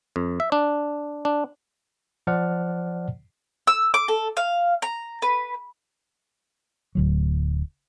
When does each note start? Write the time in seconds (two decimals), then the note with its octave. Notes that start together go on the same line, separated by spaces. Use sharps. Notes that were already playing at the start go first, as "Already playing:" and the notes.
0.16 F2
0.40 E5
0.52 D4
1.25 D4
2.27 F3 C5 D5 F#5 A5 F6
3.67 E6
3.94 D6
4.08 A4
4.37 F5
4.82 A#5
5.22 B4
6.95 D1 D2 F#3